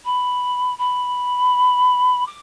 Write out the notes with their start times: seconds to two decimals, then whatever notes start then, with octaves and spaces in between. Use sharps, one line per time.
0.04 B5
0.78 B5
2.26 D6